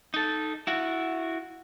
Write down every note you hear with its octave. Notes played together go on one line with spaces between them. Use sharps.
D#4 A4
E4 F#4